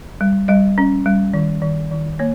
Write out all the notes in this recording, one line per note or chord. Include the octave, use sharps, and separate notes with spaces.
G3
G3 D#5
C#4
G3
D#3
D#3
D#3
A#3 C#5